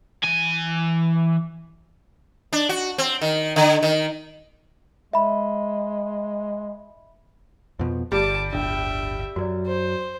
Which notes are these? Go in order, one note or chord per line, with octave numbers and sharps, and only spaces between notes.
E3 G#5
D4
F#4
C4
D#3
D3
D#3
G#3 E5 B5
F2 B2 F3
G1 G3 A5 D6
D1 G1 D4 E5 G5
F#2 F#3 F#4 D5
C5